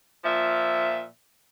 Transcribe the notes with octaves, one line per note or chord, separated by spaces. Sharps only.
A#2 F3 E5